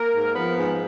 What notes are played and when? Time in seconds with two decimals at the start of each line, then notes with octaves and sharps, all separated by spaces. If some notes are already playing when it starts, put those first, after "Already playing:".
Already playing: A#3 A#4
0.13 G#2
0.35 F3 B3 B4
0.57 G#2